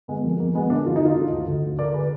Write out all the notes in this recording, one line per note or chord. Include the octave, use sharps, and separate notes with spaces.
D3 G#3 B3
F2 A#3
F2 A#3
F2 G#3 B3
D3 A#3 D4
D3 F4
D#4
D3 D4 F4
D3
D2
D2
D3
D3 A#4 D5
D3 G#4 B4